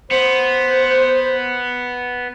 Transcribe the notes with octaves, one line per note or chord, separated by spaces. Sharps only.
B3 C5